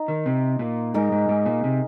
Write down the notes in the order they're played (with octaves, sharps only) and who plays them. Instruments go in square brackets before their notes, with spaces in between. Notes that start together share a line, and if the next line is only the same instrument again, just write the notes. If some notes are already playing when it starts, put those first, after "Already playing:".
Already playing: [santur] D#4
[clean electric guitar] D#3
C3
A#2
[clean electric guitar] G#2 [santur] G#3 D#4 A#4
[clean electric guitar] G#2
G#2
A#2
C3